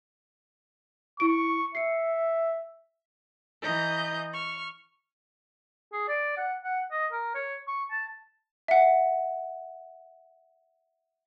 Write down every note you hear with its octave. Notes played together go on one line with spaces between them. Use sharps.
E4 C#6 D7
E5 C7 C#7
E3 D#5 A#5 G6
C#6 F6
G#4
D5
F#5
F#5
D#5
A#4
C#5
C#6
A5
E5 F#5